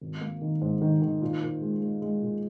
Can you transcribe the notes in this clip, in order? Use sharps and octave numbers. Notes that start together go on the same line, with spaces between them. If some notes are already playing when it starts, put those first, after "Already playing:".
G#1
A#3
D#3
G#2
D#3
D#3
A#2
A#2
G#3
G#3
G#3
A#2